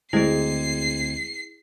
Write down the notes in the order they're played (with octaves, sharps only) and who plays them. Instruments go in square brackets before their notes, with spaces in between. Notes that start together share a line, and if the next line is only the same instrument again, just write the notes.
[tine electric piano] D2 C4 G#6 [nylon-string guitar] G#3 [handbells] E4 G#4 [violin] C7